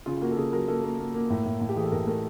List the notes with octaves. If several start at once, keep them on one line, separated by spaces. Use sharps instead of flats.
C#3 F4
F4
A#3 F#4
A4
C#3 G#4
F#3 A#4
A#3 A4
A#3
A#3
A#3
A2
A2
A2
G4
E3 G#4
A4
A2 A#4
A3 A#4